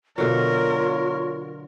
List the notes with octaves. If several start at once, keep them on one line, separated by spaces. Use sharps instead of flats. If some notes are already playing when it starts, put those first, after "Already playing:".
B2 D3 F#3 F4 A#4 C#5